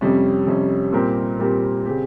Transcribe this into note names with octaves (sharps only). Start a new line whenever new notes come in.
F2 C3 G3 C#4
F2 C3 G3 C#4
A#2 G3 C4 G4 A#4
A#2 G3 C4 G4 A#4
C#3 G3 C4 G4